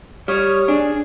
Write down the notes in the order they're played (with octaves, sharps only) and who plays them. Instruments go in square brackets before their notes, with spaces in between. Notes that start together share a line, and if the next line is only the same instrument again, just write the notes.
[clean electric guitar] G3 [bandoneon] C#5 D#6 F6
[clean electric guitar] D4 [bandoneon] G#4